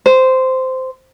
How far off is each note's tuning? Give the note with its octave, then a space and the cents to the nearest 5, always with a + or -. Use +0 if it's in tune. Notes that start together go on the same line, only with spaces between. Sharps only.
C5 -10